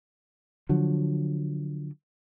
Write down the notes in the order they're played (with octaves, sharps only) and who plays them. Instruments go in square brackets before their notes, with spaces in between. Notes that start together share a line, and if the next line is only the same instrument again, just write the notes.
[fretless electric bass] D3 F3 F#3